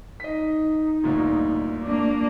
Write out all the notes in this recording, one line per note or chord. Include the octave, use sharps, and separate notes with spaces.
D#4 D#5 B6
G1 D2 A#2
A#3 D4